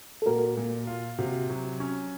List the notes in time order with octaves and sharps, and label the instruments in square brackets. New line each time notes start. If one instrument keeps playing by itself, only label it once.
[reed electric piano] A4
[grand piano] A#2 [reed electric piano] F#4 A#4
[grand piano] A#2
F4
[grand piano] C3 [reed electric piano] F#4
[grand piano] F#3
C#4